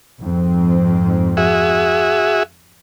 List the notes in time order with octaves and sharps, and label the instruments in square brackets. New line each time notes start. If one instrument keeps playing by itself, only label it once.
[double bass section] F2 G#2 C4
[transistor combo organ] F#4 G#4 E5